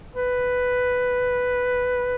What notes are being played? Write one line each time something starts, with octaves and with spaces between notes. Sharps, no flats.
B4